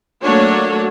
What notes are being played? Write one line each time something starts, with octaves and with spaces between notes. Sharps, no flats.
F#3 A3 A#3 D4 F#4 C#5